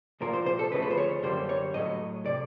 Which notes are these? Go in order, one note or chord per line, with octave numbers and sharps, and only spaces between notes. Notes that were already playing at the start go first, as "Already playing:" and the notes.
C2 A#2 F3 A#3 A#4
C5
C5
A4
D2 C#3 F3 A3 B4
B4
C5
C#5
F#2 D3 G3 A#3 C5
C#5
A2 F#3 A3 D#5
C3 D5